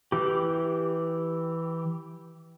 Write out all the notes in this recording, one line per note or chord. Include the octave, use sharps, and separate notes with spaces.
E3 G4